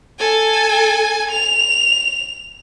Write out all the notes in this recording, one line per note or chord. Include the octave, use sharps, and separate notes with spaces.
A4 G#5
F7